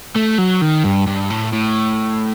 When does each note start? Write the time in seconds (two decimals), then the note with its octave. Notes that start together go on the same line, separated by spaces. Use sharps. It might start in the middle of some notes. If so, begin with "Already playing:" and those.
0.16 A3
0.38 F#3
0.62 D#3
0.84 G2
1.07 G2
1.30 A2
1.52 A2